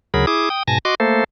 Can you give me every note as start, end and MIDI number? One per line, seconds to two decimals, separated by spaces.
0.14 0.26 38
0.14 0.26 49
0.14 0.26 54
0.14 0.26 68
0.14 0.26 70
0.14 0.26 83
0.27 0.49 64
0.27 0.49 68
0.27 0.49 86
0.27 0.49 87
0.50 0.63 79
0.50 0.63 87
0.68 0.78 44
0.68 0.78 47
0.68 0.78 80
0.68 0.78 81
0.68 0.78 94
0.85 0.95 66
0.85 0.95 75
0.85 0.95 84
0.85 0.95 86
1.00 1.24 57
1.00 1.24 58
1.00 1.24 69
1.00 1.24 72